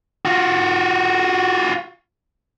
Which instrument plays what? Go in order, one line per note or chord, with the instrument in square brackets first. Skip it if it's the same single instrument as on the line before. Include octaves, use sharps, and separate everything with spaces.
[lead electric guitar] F4 F#4